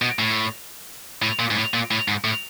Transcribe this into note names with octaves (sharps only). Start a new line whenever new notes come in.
B2
A2
A2
A#2
G#2
A2
A#2
A2
G#2
A2